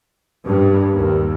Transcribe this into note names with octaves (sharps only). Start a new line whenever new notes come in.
G2
D#2